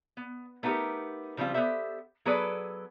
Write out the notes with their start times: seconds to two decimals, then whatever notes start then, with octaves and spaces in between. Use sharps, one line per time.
0.17 B3
0.63 A3 B3 D#4 F#4 G4 A#4
1.37 C#3 F3 G3 C4 F4
1.54 B3 G4 A4 C5 E5
2.25 F#3 B3 G#4 A4 B4 D5